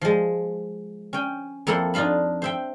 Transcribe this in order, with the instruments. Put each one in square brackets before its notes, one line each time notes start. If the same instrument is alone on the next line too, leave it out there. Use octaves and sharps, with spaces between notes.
[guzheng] F3 G#3
C#4 G5
F2 A#3 E4 A4 F#5 C6
D4 D#4 F4 F5 B5
C5 E5 G5